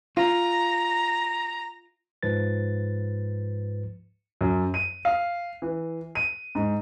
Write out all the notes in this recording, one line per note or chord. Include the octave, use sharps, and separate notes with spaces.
F4 A#5
G#2 F3 B4 A6
F#2
D#7
F5
E3
D#7
G#2